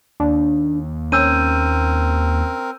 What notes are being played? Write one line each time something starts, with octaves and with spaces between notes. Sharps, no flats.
D#2 D4
C4 C#4 A#4 E6 G6 D#7